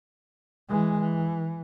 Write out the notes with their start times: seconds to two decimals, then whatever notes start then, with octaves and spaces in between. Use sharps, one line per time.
0.69 E3 G#3
1.00 E3